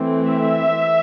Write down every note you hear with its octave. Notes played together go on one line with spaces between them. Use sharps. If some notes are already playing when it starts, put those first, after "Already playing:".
Already playing: E3 A3 C4
E5
E3